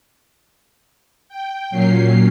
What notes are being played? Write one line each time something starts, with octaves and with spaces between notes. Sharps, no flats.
G5
A#2 F#3 C#4 C7